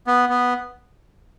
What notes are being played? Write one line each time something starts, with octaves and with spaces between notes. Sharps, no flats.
B3
B3